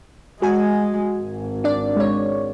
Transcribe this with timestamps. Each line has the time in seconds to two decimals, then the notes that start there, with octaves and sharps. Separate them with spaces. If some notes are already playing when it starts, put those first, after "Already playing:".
0.42 G#3 F#4 G#5
1.18 G#1
1.64 D4 D5
1.96 G#3 C#5